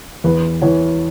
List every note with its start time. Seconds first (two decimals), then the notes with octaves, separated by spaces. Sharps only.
0.24 E2 B4
0.62 E3 C#5